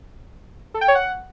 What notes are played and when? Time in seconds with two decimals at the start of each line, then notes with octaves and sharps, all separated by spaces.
0.74 A4
0.81 G5
0.88 C#5
0.95 F#5